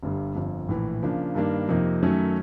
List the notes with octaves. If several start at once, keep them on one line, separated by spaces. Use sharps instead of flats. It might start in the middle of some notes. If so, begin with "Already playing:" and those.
G1 G2 D3 G3
G1 F2 D3 F3
A#1 A2 E3
C#3 F3 A#3 D4
G2 D#3 G3 A#3 D4
F2 C3 F3 A#3 D#4
F#2 D#3 F#3 A3 C#4